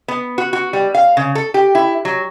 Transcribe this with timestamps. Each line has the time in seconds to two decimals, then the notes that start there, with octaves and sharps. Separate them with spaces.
0.08 B3
0.38 F#4
0.53 F#4
0.73 G3
0.94 F5
1.17 C#3
1.35 A4
1.54 G4
1.75 E4
2.05 F#3